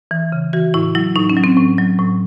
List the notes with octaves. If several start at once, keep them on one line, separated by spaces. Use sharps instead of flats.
E3
C#3
E3 F#4
A2 E4
F#3 E4
A2 D#4
C#4
F#3
C4
A2
F#3
A2